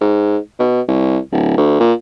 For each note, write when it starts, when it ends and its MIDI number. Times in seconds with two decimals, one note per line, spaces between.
0.01 0.38 44
0.59 0.81 47
0.88 1.18 36
1.32 1.53 26
1.57 1.79 38
1.80 1.93 46